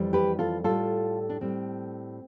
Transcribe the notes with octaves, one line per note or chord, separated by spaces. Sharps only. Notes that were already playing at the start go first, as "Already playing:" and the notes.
Already playing: F2 E3 G3
G4 B4
F4 A4
A2 G3 F4 A4
D4
A2 G3 C4